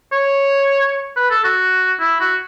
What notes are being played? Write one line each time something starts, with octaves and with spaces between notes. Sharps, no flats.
C#5
B4
A4
F#4
E4
F#4